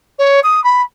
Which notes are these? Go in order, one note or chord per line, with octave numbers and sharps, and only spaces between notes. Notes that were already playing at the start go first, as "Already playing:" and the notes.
C#5
D#6
B5